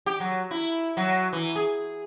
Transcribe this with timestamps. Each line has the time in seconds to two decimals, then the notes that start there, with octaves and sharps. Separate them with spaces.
0.06 G4
0.20 F#3
0.51 E4
0.97 F#3
1.33 E3
1.56 G#4